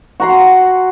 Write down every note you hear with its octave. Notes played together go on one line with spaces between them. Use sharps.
F#4 A#5 C6